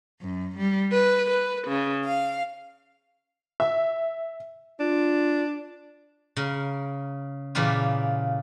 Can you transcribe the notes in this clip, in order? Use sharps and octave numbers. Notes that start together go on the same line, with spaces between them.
F#2
G3
B4
B4
C#3
F5
E5
D4 F4
C#3 A#4
A#2 C#3 E3 A#3 F4 G4